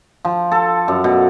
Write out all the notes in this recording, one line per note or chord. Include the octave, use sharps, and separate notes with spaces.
F3
A4
F#2
B2